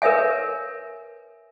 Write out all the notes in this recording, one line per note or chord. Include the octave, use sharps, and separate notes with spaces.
A#4 B4 C#5 E5 G#5